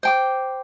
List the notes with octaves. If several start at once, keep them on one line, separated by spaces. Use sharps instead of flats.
C5 G5 D6